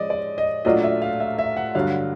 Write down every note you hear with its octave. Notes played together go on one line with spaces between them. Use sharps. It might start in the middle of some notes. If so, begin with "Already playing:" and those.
Already playing: F3 G#3 C#4 D5 D#5
D5
D#5
A#2 F#3 A3 D4 F4 D#5
E5
F5
E5
E5
F#5
G2 D3 F#3 F5